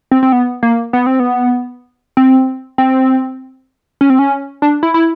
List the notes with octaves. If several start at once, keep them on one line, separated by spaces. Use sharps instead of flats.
C4
C4
B3
A#3
B3
C4
B3
C4
C4
C#4
C4
C#4
D4
E4
E4